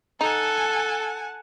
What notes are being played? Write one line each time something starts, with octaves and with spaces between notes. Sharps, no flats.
D#4 A4 F#5 G#5 A5